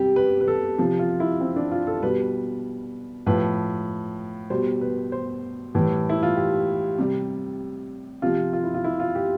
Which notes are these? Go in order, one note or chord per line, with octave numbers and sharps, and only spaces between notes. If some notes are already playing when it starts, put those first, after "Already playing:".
Already playing: C3 G3 G4
B4
B4
A4
C3 F3
F4
E4
C4
D4
F4
A4
B2 G3 B4
A2 F3 B4
B2 G3 C5
B4
C5
A2 E3 G3
E4
F4
G4
C3 G3
C3 F3 F4
F4
E4
F4
E4
F4
G4